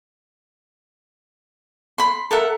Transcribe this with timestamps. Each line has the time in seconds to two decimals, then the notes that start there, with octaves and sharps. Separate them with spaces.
1.98 B5 C6
2.31 A4 A#4 E5 F#5